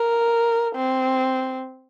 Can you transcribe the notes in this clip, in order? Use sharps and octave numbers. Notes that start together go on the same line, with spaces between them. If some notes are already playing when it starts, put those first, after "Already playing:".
Already playing: A#4
C4